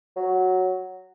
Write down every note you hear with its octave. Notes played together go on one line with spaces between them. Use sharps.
F#3